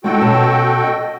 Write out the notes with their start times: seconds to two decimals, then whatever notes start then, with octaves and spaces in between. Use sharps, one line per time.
0.04 G#3 D#4 F4 F#4 A4 G5
0.21 B2 C#4 A5
0.83 D#5